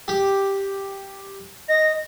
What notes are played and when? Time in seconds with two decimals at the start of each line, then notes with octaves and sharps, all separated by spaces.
0.08 G4
1.69 D#5 A#6